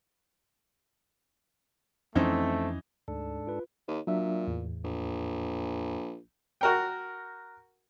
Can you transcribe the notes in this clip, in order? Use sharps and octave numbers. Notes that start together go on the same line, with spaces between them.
F2 E3 A3 C4 C#4 D#4
D2 G#2 D4 A4
F4 B4
D#2
A#2 F#3 D4 E5
E2 A2
A#1
F#4 A#4 G5